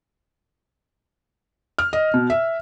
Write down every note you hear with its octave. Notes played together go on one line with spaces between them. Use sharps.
F6
D#5
B2
E5